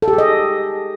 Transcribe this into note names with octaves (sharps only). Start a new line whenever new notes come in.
A4
G4
G#4
D#5